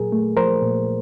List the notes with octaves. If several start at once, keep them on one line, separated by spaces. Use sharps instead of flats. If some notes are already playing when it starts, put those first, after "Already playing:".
Already playing: A#2 F#3 G#4 A#4
A3
F3 A#4 C5
A#2